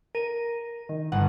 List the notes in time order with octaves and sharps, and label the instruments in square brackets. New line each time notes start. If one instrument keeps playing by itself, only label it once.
[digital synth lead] A#4 [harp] D#7
[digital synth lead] D#3
[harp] G1 [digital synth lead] F#5